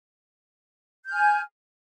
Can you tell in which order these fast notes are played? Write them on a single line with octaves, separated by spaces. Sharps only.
G6 F6 G#5